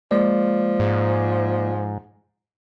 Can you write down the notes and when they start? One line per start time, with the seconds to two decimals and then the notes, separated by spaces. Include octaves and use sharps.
0.11 F3 G#3 A#3 D5
0.80 G#2